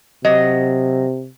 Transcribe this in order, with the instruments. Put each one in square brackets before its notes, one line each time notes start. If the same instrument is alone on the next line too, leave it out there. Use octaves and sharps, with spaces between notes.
[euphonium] C3 [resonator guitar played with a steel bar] F#3 D#5